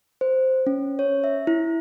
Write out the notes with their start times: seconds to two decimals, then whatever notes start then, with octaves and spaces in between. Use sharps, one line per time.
0.21 C5
0.66 C#4
0.99 C#5
1.24 E5
1.47 E4